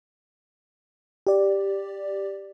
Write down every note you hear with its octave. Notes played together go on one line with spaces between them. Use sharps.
G4 D5